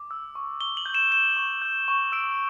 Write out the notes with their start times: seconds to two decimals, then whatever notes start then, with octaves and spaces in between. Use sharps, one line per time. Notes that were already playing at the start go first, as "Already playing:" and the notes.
Already playing: D6
0.11 E6
0.35 C#6
0.61 C#6 G7
0.77 F#7
0.86 G6
0.94 E7
1.11 G6 E7
1.36 C#6
1.62 G6
1.88 C#6
2.12 E6 D7